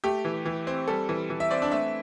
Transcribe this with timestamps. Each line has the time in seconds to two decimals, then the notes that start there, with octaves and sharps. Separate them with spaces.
0.04 A3 G4
0.25 E3
0.45 E3
0.67 C4
0.88 G3 A4
1.09 E3
1.30 E3
1.40 E5
1.51 C4 D5
1.62 D4
1.72 A3 E5